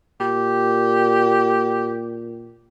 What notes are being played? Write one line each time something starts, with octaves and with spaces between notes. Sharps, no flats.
A#2 G4